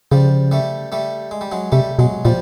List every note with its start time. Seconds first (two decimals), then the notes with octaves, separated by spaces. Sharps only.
0.12 C#3 F3 G3
0.51 G3 A3
0.92 G3 A3
1.31 G#3
1.41 G3
1.52 F#3 G#3
1.72 C3 G3 A3
1.99 B2 F#3 G#3
2.25 A#2 F3 G3